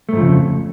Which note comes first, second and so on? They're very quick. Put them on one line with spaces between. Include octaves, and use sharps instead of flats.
A3 G#2 F3 C#3 F2